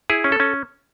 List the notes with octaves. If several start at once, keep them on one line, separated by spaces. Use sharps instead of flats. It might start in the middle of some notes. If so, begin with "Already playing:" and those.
E4 G#4
C#4
A4
C#4